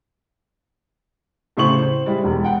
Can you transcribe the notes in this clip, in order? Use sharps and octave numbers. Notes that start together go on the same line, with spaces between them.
A2 C#3 E4 C5 C#6 F#7
C5
G3 G#3 E4
E1
F#5 G5